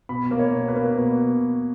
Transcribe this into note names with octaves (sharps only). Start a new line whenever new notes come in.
B2 B5
A#3
C#5
B2
B4
A#3
B2 B4